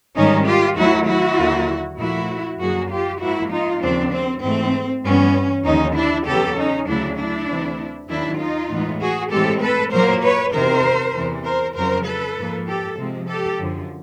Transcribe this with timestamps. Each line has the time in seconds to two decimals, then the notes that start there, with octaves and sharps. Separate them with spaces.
0.15 G#2 D#3 G3 C#4 D#4
0.46 F4 G4
0.76 D#2 D#3 F#3 A3 E4 F#4
1.07 E4 F#4
1.38 D#2 D3 F#3 A#3
1.98 A#2 F3 A3 E4 F#4
2.59 F#2 D3 F#3 A#3 F#4 G#4
2.90 F4 G4
3.20 G#2 F3 A#3 E4 F#4
3.51 D#4 F4
3.82 D#2 C#3 F3 C4 D4
4.12 C4
4.42 G#2 E3 A3 C4
5.04 G2 E3 G3 B3 C#4
5.64 D#2 D3 F3 C#4 D#4
5.95 D4 E4
6.26 E2 C#3 F#3 B3 G4 A4
6.57 C#4 D#4
6.87 D2 C#3 F#3 A3 D4 E4
7.17 D4 E4
7.48 D2 C3 E3 A3 C4
8.09 D#2 D#3 F#3 D4 E4
8.40 D#4 F4
8.70 A2 E3 G#3 B3
9.01 F#4 G#4
9.31 A2 E3 G#3 C4 G4 A4
9.61 A4 B4
9.92 A#2 F#3 A#3 A#4 C5
10.23 B4 C#5
10.53 E2 C3 D#3 A#4 C5
11.15 E2 C3 E3
11.44 A#4 C5
11.75 F2 C#3 F#3 A#4 C5
12.06 A4 B4
12.37 G#2 F3 A#3
12.67 G4 A4
12.98 C3 F3 G#3 C4
13.28 G4 A4
13.58 F#2 D3 F3